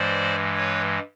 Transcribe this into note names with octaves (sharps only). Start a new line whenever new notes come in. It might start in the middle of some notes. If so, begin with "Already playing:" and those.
Already playing: G2 E3 G#3 C5 D5
B4 C#5